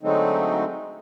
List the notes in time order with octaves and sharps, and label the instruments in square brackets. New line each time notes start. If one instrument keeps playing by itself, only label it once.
[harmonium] D3 F#3 G#3 A3 C4 D#4